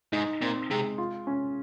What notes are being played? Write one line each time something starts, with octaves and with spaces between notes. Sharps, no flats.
G#2 D#4
A#2 C4
C3 G#3
F4
C#4